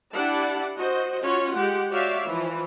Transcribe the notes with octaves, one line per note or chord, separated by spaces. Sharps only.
D4 E4 G4 D5 F#5 A5
F#4 C5 D#5
C#4 F4 F#4 C#5
G#3 G4 F#5
F#4 G4 C#5 D5 E5 F5
E3 F3